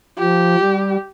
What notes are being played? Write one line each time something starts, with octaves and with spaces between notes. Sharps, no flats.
F3 G4
G3